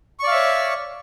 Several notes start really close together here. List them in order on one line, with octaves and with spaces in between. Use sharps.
C#6 D5 F5 E5 C#5